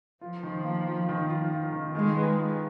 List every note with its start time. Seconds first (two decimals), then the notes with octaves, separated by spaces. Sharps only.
0.21 F3 F4
0.43 D#3
0.65 A#3
0.87 F4
1.09 D#3
1.30 F4
1.51 F4
1.72 D#3
1.95 D#3 G#3
2.17 B4
2.38 F4